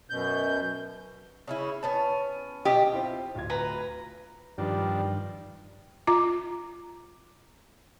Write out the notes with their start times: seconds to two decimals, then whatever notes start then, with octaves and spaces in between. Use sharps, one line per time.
0.10 F#2 B2 G6
1.47 C#3 C#4 E4
1.83 B3 C#4 A5
2.65 B2 G4 D#5
2.93 C4 E4 F4
3.35 D1 F4 G#6
3.50 B4 A#5
4.58 G2 D#3 F3 G3 D4
6.07 F4 A#5 D6